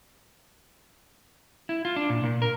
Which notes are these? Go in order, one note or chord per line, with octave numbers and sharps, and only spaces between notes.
E4
F4
D4
A#2
A#2
A#4